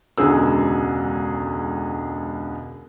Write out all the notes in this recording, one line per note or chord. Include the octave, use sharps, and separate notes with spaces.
E1 C#2 D3 G#4 E6